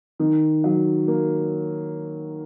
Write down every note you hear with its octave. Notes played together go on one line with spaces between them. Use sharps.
D#3
F#3
A#3